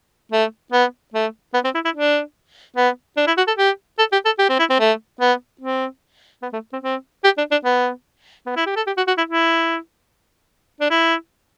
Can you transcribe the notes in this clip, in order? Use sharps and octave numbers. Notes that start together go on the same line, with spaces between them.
A3
B3
A3
B3
C4
E4
E4
D4
B3
D4
E4
F#4
A4
G4
A4
G4
A4
G4
C4
E4
C4
A3
B3
C4
B3
A3
C4
C4
G4
D4
D4
B3
B3
E4
G4
A4
G4
F#4
F#4
E4
E4
D4
E4